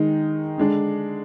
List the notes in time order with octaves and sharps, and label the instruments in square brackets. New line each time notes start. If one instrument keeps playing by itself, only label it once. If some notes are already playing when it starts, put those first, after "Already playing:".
Already playing: [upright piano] D#3 G#3 D#4
D3 G#3 D4